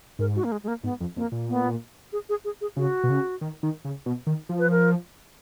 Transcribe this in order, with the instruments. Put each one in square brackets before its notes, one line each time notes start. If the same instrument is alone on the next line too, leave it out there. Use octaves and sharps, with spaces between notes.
[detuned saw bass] G#2 [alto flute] A#4
[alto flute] F#4
A#3
G#3
G#3
A#3
[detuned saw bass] G#2 [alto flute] B3
[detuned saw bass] F2
[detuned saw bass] F2 [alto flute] A#3
[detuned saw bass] A#2
[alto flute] B3
G#4
G#4
G#4
G#4
[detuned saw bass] C#3 [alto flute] F#4
[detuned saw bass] B2
C#3
D#3
D#3
C#3
B2
D#3
F3
[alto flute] B4
A#4